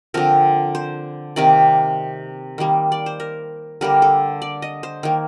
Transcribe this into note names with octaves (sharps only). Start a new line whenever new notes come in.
D3 F3 C4 A#4
C5
C3 D#3 A#3 D5
D#3 G3 A#3
D5
C5
A#4
D3 G3 A#3 A#4
A4
D5
D#5
C5
D#3 A#3